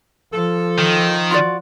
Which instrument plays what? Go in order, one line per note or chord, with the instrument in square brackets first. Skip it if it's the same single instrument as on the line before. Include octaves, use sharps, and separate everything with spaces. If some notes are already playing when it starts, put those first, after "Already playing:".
[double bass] F3 [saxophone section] A4
[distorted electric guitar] D#3
[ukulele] F4 F#4 D5